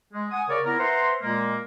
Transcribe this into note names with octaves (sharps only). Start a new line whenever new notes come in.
G#3
F#5 G#5 D#6
C#3 A#4 C#5 D5
B3 E4 A#4
B4 C5 E5 F#5 A#5 C6
A#2 G#3 A#3